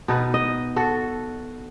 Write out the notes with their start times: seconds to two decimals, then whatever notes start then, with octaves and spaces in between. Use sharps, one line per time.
0.08 B2 D#4 B4
0.34 D#5
0.76 F#4 A4